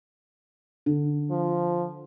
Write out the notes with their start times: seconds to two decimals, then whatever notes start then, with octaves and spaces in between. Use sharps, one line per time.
0.86 D3
1.30 F3